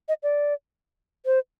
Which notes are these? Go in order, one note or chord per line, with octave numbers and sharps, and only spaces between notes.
D#5
D5
C5